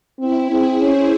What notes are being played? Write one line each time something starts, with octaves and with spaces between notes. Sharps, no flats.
C4 E4
C4 G#4
C#4 C5